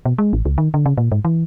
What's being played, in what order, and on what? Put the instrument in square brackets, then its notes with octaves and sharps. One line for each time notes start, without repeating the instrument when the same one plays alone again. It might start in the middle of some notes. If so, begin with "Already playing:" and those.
[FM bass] B2
G#3
A1
C#2
D#3
D3
C#3
A#2
G#2
E3